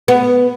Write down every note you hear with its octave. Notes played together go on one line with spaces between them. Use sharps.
B3